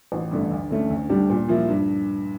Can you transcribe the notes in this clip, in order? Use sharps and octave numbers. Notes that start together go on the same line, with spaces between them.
A1
G2 D3 A3
D2
D3 A3 C#4
D2
D3 G3 D4 G4
A#2
F3 A#3 E4
G2